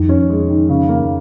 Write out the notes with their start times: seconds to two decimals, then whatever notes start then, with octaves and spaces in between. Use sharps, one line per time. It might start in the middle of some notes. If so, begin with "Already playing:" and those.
Already playing: F2 D#3
0.09 C#4
0.30 G#3
0.49 D#3
0.69 C#3
0.89 A#3